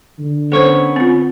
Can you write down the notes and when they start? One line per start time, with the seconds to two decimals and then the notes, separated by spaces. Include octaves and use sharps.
0.19 D3
0.52 B3 C#4 A4 C5 C#5
0.96 C4 F4